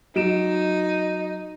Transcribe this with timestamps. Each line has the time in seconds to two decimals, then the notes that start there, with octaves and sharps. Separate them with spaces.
0.16 F#3 D#4 D7 E7